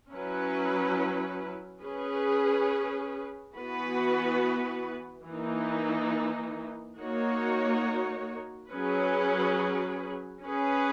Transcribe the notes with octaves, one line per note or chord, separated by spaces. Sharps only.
F#3 C#4 E4 B4
C#4 G#4 B4
E3 B3 F#4 B4
E3 A#3 D#4
A#3 D#4 F#4 C#5
F#3 C#4 G#4 B4
C#4 G#4 B4